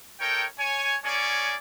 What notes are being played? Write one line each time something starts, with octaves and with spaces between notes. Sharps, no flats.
D#4 A4 A#4 C#5 G5
C#5 G#5
A#3 C#4 G#4 C#5 D5 G#5